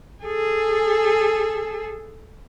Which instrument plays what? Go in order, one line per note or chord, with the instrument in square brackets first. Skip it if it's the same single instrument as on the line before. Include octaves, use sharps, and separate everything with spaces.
[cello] G#4 A4